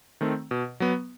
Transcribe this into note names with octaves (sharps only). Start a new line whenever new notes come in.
D#3 A3 C4
B2
F#3 B3